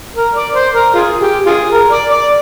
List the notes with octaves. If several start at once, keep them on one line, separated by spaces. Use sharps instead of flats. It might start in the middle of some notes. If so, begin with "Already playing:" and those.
A#4
D5
C5
A#4
F4 G#4
G4
F4 G#4
A#4
D5
D5